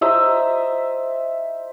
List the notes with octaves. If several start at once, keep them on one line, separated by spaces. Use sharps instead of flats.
C5 D#5 E5 A#5